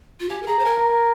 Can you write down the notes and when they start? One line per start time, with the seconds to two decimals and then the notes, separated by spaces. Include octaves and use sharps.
0.20 F4
0.29 G4 G#5
0.42 A#4
0.47 G#4 A#5
0.59 C5
0.65 A#4 G#5
0.77 A#5
0.89 A#5